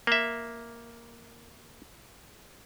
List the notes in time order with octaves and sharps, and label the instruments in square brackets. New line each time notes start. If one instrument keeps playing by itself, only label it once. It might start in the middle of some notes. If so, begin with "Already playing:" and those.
[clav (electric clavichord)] A#3 E5